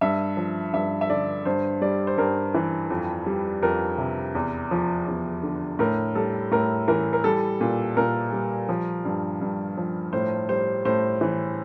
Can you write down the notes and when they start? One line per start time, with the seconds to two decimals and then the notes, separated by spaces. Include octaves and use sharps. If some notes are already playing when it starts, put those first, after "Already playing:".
0.01 G2 E5
0.37 F3
0.73 G2 E5
1.01 E5
1.10 D3 D5
1.45 G2 C5
1.82 G3 D5
2.07 C5
2.18 G2 A#4
2.55 E3
2.90 F2
3.26 G3
3.63 F2 A#4
3.98 C3
4.35 E2
4.71 F3
5.08 E2
5.43 D3
5.79 A2 A#4
6.15 G3 A4
6.51 A2 A#4
6.88 E3 A#4
7.13 A#4
7.24 G3 A4
7.61 A#2
7.97 A#2 A#4
8.32 G3
8.69 F3
9.05 G2
9.41 G2
9.77 F3
10.13 A2 C5
10.49 G3 C5
10.85 A2 C5
11.21 E3